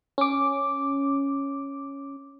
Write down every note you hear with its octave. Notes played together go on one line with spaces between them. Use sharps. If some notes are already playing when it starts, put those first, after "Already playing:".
C#4 D6